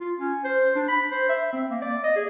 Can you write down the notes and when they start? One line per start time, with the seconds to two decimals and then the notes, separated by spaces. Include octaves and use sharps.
0.01 F4
0.19 C#4
0.44 C5
0.75 D4
0.88 B5
1.11 C5
1.29 E5
1.53 C4
1.70 A#3
1.82 D5
2.04 D#5
2.16 G#4